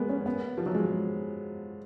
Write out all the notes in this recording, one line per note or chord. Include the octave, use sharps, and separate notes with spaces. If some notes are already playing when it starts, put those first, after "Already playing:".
Already playing: G#3 A#3 B3
C#4
B3
F3
F#3
G#3